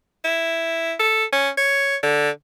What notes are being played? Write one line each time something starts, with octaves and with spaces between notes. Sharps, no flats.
E4
A4
C#4
C#5
D3